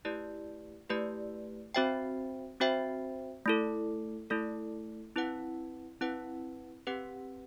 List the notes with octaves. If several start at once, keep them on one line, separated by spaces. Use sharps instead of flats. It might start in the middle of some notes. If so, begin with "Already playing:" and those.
A3 E4 G4 B4 D5
A3 E4 G4 B4 D5
C4 F#4 C5 E5 G5
C4 F#4 C5 E5 G5
A3 E4 A4
A3 E4 A4
C4 E4 B4 F#5
C4 E4 B4 F#5
C4 G4 B4 F#5